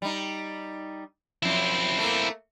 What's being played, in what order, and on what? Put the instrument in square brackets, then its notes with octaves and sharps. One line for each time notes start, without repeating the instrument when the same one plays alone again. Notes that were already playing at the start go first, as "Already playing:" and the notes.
[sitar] G3 D#4
[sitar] F#2 F3 [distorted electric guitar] C4 E4
[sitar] A3 A#3